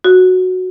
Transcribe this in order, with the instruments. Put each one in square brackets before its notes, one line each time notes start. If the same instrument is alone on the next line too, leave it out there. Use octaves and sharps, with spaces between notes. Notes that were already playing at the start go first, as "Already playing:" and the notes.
[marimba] F#4